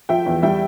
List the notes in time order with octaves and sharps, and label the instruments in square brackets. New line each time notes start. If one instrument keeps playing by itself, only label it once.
[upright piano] F3 [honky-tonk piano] E5 G5
[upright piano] E2
[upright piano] G3 [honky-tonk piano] E5 G5